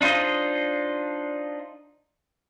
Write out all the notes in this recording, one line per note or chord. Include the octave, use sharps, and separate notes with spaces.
D4 D#4 F4 C5 D#5